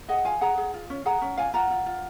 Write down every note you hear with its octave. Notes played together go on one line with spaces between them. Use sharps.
G#4 D#5 F#5
F4 F5 G#5
G#4 F#5 A#5
G#4
F4
C#4
G#4 F#5 A#5
C#4
F4 F5 G#5
F4 F#5 A#5
F4
F4